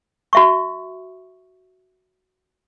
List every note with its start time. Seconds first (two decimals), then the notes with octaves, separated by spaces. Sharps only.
0.33 F#4 E5 C#6